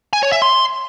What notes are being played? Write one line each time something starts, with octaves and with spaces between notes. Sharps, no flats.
G#5
C#5
E5
C6